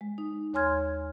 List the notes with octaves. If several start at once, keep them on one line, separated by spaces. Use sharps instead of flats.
G#3
D#4
D#2 C#5 G#5 C6 F6 G#6